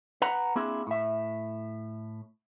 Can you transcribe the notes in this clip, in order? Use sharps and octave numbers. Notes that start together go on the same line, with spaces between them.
B4 F#5 A#5 B5
A#3 C4 D4 E4 G#4
A2 E5